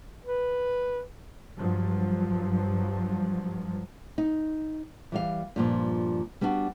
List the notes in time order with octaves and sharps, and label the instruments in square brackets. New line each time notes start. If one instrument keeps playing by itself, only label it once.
[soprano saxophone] B4
[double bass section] G2 F3 F#3
[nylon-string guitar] D#4
E3 G3 F5
G2 A#2 F3
G3 B3 D4 D#4 F#4